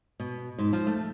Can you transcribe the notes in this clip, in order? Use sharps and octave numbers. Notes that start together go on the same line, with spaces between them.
B2
G#2
F3
A3